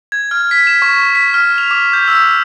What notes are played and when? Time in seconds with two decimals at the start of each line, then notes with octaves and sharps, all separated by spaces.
0.12 G#6
0.31 F6
0.51 B6
0.67 E7
0.82 C#6
1.15 B6
1.34 F6
1.58 F7
1.71 D6
1.93 G6
2.08 E6